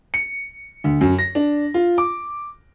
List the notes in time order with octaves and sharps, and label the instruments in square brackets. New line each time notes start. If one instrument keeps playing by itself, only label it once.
[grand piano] C#7
D2
F#2
A#6
D4
F4
D6